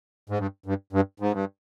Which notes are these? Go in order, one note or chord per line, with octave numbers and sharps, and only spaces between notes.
G#2
G2
G2
G2
G#2
G2